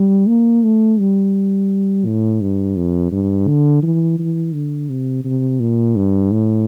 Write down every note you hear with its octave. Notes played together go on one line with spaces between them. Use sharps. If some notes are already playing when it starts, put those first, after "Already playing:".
Already playing: G3
A#3
A3
G3
A2
G2
F2
G2
D3
E3
E3
D3
C3
C3
A#2
G2
A2